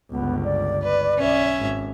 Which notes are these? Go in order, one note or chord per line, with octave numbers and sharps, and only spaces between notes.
G1 C#2 B3
D5
B4
B1 C#4 E5
G#1